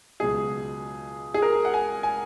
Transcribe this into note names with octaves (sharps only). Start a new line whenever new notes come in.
C#2 B2 F#3 G#4
G#4
A#4
F#5
G#5
G#5